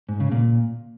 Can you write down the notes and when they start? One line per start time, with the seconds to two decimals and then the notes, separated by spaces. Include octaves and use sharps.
0.09 G#2
0.20 C#3
0.32 A#2